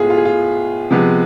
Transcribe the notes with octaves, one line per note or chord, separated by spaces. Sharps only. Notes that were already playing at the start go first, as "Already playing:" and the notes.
Already playing: A2 G#3 B3 F4 G#4
F4
G#4
F4
C3 F3 G#3 B3